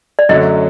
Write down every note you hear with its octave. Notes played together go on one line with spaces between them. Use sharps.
D5
F#2 D3 F#3 A3 C#4 D#5